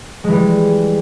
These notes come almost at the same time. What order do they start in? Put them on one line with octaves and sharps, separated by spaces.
G#3 E3 G3